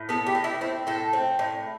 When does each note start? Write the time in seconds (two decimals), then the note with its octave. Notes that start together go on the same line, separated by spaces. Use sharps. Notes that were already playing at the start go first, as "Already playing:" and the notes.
Already playing: A2
0.09 B3 A4
0.26 G4
0.35 A2
0.44 E4
0.61 C4 E4
0.87 A2 A4
1.13 C4
1.39 A2